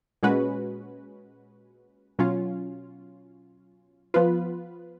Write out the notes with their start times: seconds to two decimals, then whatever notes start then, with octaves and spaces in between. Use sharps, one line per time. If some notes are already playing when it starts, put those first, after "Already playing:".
0.23 A#2 G#3 C#4 F#4 B4
2.19 B2 F#3 C#4 F4
4.14 F3 B3 F4 B4